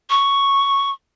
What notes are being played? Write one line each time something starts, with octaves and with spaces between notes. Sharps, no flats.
C#6